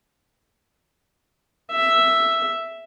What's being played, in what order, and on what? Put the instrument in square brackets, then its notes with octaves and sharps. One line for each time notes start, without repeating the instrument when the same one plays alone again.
[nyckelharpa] E5